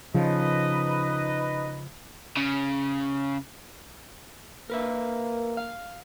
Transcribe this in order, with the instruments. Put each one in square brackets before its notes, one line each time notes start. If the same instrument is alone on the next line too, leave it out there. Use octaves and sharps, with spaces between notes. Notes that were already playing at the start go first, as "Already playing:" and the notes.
[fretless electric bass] C#3 F3 [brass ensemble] D#4 B4 D#5
[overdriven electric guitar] C#3
[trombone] A#3 [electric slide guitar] A#4 B4 E5
[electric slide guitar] F5